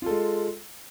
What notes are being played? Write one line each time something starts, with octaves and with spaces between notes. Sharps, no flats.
G#3 F4 A4